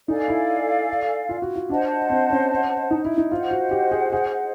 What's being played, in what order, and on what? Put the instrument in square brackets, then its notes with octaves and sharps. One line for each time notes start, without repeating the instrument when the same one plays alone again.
[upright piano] D#4 [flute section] A4 D5 F5 G#5
[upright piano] E4
F4
F#4
F4
[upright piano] D4 [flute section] C5 D#5 F#5 A5
[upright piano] C4
C#4
D#4
E4
D#4
[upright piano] F4 [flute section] C5 D#5 F#5
[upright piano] F#4
G4
G#4
G#4